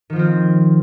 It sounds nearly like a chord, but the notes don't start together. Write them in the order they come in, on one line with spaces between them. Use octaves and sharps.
D#3 F3 F4 C4